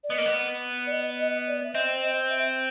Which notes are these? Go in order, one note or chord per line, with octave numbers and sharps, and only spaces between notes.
D5
B3 D#5
A#3
B3
D5
D#5
D#5
D5
E5
C4 D#5
D#5
E5